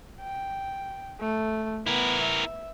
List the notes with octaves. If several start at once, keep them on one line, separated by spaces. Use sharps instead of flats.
G5
A3
B3 E4 A#4
E5